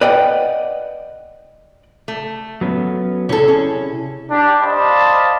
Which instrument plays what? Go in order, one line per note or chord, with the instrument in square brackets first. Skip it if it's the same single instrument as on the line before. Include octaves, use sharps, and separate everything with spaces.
[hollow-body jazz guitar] B4 D5 D#5 F#5 G5
[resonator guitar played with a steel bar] A3
[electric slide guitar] F#3 B3 C#4
[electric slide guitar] C3 E4 G#4 [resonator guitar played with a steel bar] C#4 A4
[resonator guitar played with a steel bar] C#4
[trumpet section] D4 G4
C5 D5 D#5 F5 A5 B5